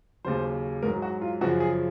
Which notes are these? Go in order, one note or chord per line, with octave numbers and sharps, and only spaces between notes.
D#2 C#3 F#3 C5
G#2 A#4
F#3
F#4
F4
F#2 C#3 F3 F#4
G#4